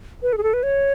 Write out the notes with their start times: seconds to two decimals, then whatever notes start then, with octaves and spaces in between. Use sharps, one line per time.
0.22 B4
0.33 A4
0.38 G#4
0.43 A4
0.54 B4
0.63 C#5